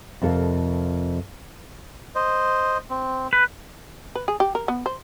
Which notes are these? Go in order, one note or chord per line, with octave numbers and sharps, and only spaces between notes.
F2 C3 F4 A4 A#4 F5
C5 D#5
C4
B4
B4
G#4
G4
A#4
B3
C5